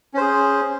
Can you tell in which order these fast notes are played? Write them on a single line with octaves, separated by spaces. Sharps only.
C#4 C5 G#4